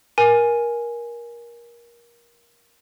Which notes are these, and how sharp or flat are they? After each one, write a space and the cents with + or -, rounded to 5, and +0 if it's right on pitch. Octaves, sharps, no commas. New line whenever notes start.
A#4 +20 G#5 +0